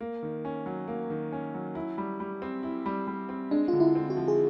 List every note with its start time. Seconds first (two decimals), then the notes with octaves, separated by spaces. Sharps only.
0.01 A#3
0.23 D#3
0.45 C#4
0.66 F#3
0.88 A#3
1.10 D#3
1.33 C#4
1.54 F#3
1.75 E4
1.98 G3
2.20 G3
2.42 C4
2.63 E4
2.86 G3
3.07 G3
3.29 C4
3.51 G#3 D4
3.68 D3 F4
3.80 E4
3.95 C4
4.10 F#4
4.17 F3
4.28 G#4